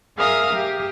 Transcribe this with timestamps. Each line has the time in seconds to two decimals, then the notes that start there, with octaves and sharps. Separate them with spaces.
0.17 G#4 A#4 E5 F5 D#6 F6
0.53 G4